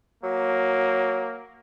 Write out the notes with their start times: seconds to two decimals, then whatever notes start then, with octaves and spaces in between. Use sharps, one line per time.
0.23 F#3 A#3